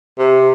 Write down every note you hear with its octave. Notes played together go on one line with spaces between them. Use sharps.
C3